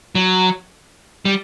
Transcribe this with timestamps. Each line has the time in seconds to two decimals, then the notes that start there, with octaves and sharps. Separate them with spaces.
0.15 F#3
1.25 G3